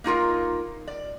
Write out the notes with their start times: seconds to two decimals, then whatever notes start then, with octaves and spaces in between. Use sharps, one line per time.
0.04 A#3 D#4 F4 A#4
0.88 D5